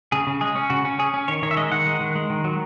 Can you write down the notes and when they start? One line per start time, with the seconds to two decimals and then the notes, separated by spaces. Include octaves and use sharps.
0.12 C#3 G#4
0.27 C#3
0.41 G#3 G#4
0.56 C#4
0.70 C#3 F#4
0.85 C#4
0.99 C#4 G#4
1.14 C#4
1.28 D#3 C#5
1.43 D#3 C#5
1.51 E5
1.57 G#3 D#5
1.72 D#3 F#5
1.86 G#3
2.01 D#3
2.16 G#3
2.30 D#3
2.44 F#3